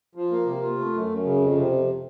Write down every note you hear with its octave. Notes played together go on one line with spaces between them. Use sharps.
F3
A#3
C3
F4
A3
F#2
F#2
C#3
F2
C3
F2